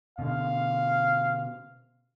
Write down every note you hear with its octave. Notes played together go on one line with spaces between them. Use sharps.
B2 D3 F5